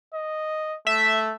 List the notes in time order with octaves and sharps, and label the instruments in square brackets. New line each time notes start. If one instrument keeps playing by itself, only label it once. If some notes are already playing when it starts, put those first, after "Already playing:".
[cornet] D#5
[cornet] A3 [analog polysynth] E5